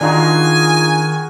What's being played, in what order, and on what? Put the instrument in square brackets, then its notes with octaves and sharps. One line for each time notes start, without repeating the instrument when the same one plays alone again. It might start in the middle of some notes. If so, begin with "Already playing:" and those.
[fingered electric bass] D#3 [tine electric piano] D4 D#4 F4 [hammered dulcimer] F#4 G#4 A#4 [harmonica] G#5